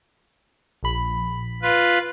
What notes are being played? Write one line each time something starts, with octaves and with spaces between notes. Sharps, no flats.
A#1 B5
F4 B4